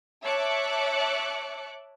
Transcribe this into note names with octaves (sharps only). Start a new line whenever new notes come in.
C#5 E5 A5 D6 F#6 C#7